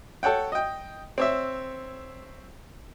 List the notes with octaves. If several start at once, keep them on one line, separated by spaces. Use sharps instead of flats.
A4 C#5 F#5 G5
D#5 G5
C4 C#5 E5